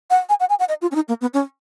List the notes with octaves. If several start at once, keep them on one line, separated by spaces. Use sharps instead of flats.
F#5
G#5
F#5
G#5
F#5
D#5
F4
C#4
D#4
A#3
B3
C#4